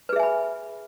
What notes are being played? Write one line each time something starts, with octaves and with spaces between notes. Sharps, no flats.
G#4 B4 E5 G#5 B5